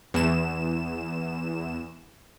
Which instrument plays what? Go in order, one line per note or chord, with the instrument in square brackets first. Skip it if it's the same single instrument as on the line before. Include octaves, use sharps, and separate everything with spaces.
[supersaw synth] E2 E7